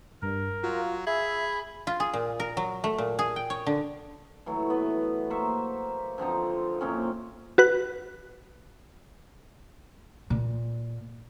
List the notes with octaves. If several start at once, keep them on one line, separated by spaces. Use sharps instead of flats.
G2 A#4
F#3 F4
G#4 E5 B5
F4
G#4
A#2
A#4
F#3
A3
A#2
G#4
G5
C#5
D3
E3 F#3 A3
B3
A#3 C5 E5 C#6
D3 F3 C4 D#4
F#2 A#2 C4 C#4
F#4 B4 F#6
A#2